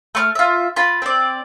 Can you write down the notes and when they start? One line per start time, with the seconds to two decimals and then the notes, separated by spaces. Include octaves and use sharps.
0.15 A3 C6 F6
0.35 F4 E5
0.76 F4 B5
1.02 C4 D5